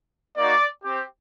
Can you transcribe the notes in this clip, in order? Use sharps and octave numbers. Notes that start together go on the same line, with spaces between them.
A#3 D#4 F#4 D5
C4 G4